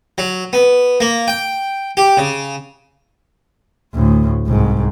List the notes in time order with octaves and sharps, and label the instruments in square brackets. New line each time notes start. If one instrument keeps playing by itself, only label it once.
[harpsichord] F#3
B3
A#3
G5
G4
C#3
[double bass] D2 A2
C2 G#2